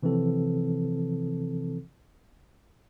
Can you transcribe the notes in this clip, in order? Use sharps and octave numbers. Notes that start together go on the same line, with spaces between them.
C3 E3 F3 C4 A4